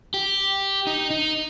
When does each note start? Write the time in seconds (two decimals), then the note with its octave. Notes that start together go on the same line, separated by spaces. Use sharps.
0.14 G4
0.87 D#4
1.10 D#4